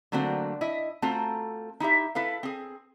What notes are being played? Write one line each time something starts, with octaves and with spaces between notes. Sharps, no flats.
D3 F#3 A3 A#3 C4 F#4
E4 D#5
A3 C4 F4 F#4 A4 A#5
D#4 E4 G4 E5
E4 A4 B4 F5
C4 G#4